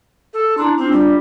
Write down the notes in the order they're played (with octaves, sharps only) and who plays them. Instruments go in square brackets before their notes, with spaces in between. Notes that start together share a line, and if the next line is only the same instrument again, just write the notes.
[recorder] A4
[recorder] D4 [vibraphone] E4 A#5 C6
[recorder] C4 [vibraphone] D4 F4
[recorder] G3